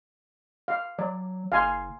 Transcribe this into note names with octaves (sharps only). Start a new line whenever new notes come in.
F5
F#3 D5
F#1 F5 G#5 C6